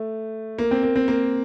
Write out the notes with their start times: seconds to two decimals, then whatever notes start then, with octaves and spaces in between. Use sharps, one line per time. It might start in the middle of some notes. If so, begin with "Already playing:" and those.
Already playing: A3
0.59 A#3
0.71 C4
0.83 A#3
0.96 C4
1.08 A#3